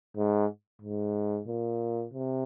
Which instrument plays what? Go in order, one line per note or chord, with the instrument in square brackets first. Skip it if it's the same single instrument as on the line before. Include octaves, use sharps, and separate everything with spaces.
[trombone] G#2
G#2
A#2
C3